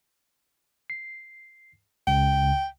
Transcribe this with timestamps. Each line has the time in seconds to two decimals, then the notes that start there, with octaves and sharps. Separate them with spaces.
0.90 C7
2.07 C#2 C#3 G5